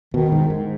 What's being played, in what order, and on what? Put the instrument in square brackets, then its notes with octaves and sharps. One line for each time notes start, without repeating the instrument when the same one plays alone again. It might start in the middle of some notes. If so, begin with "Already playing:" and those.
[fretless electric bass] B2 [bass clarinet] D#3
[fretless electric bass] G#2
G#2